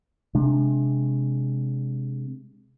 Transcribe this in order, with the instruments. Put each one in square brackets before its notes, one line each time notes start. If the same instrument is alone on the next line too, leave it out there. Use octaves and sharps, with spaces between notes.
[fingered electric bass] C3 G#3 D4